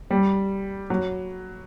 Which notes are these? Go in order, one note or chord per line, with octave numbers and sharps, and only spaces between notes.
G3
F#3